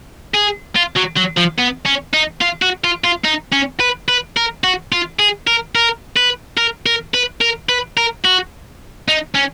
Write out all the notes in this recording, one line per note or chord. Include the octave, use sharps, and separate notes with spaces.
G#4
F4
F#3
F#3
F3
B3
C#4
D#4
F4
F#4
F4
F4
D#4
C#4
B4
B4
A#4
F#4
F4
G#4
A#4
A#4
B4
A#4
A#4
B4
A#4
B4
A#4
F#4
D#4
C#4